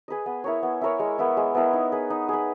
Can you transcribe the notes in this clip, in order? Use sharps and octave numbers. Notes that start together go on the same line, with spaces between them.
G#4 B4 D#5
B3
E4 A#4 C#5
B3
E4 A#4 C#5
G#3
B3 E4 A#4
G#3
B3 E4 A#4
D#4
G#4 B4
D#4
G#4 B4